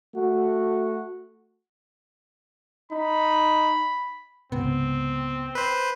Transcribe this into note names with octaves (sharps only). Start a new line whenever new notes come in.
A3 F#4
D#4 B5
C#2 G#2 C3 B3 C4
B4 C5